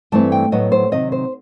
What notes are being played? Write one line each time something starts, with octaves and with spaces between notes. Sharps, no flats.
G2 E3 A3 C4 A5
G5
A2 F#3 B3 D#5
C5
C3 D#3 F#3 C4 D#5
C5